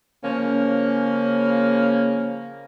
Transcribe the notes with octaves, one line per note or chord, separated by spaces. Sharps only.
C#3 F3 A#3 C#4